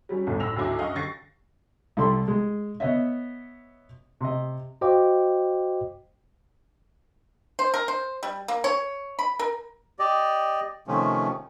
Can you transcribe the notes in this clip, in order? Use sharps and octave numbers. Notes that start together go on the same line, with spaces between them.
F#3 G3 C#4
G1 D2 A2
A2 B5 E6 A#6 F7
D2 G#2 F#3 E4 D6
F#1 D#5 F5 F#5 C#6
D3 G4 C#6 A6 A#6 C7
C2 E4 G4 A4 D5 C6
G#3
B3 C#5 D#5 E5
C3 D#5
F#4 C5 D#5 F5 G5 D6
C5
A#4
C5
G3
A#3
C#5
B5
A#4
G4 D5 D#5
C3 D#3 F3 A3 C#4